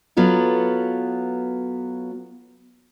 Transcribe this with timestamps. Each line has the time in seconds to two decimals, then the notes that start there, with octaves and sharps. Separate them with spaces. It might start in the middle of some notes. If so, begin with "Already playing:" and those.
0.17 F#3 B3 F4 A4